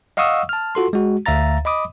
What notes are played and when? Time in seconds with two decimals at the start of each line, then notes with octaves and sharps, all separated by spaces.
0.17 D#5 F5 F#5 C#6 D#6 E6
0.49 A5 F6
0.75 F4 F#4 A4 C6
0.93 G#3 F#4
1.26 D2 E5 F5 A#5 A6
1.65 D#5 B5 D6 D#6